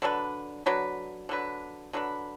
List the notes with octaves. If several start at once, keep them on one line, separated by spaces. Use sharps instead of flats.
D3 F#3 D4 B4
D3 F#3 D4 B4
D3 F#3 D4 B4
D3 F#3 D4 B4